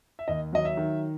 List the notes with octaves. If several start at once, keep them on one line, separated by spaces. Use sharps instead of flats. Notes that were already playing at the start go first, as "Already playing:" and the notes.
E5
D#2 D#5
F#3 D#5
E5
D#3